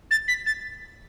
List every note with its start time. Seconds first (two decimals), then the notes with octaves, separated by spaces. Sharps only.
0.11 A6
0.28 B6
0.46 A6